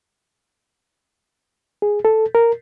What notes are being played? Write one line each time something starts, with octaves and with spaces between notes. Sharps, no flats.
G#4
A4
A#4